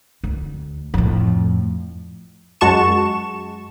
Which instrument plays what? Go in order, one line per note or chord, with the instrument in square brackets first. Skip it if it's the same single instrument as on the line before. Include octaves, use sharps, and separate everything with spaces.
[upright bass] D2
F2 A2
[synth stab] F#2 G#3 F#4 A5 C#6 E7